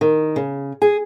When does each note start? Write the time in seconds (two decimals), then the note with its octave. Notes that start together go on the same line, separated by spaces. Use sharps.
0.01 D#3
0.36 C#3
0.82 G#4